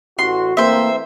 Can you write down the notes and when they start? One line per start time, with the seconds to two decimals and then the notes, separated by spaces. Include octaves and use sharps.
0.19 A1 F#4 C6
0.57 E3 A3 A#3 C4 C5 E5